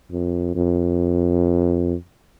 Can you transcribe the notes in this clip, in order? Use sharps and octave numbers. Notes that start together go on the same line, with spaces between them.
F2
F2